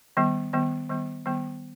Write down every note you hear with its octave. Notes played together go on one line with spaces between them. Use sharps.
D#3 G3 B3
D#3 G3 B3
D#3 G3 B3
D#3 G3 B3